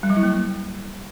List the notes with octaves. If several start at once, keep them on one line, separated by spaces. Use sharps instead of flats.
G3
F#3
E4
A#3